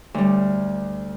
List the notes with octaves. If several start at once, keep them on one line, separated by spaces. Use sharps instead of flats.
D2 G3